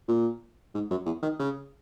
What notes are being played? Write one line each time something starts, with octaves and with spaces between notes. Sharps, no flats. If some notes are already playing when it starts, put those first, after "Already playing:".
A#2
G#2
F#2
E2
D#3
C#3